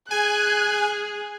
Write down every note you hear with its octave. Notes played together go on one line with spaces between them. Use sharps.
G#4 G#5 F#6